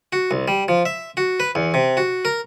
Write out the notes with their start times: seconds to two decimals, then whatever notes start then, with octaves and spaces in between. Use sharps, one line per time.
0.13 F#4
0.31 C2
0.48 G3
0.68 F3
0.86 E5
1.17 F#4
1.40 B4
1.55 E2
1.74 C3
1.97 F#4
2.25 A#4